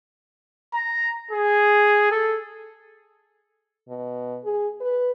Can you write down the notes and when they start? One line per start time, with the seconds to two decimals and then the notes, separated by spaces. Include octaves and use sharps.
0.74 A#5
1.31 G#4
2.11 A4
3.89 B2
4.44 G#4
4.80 B4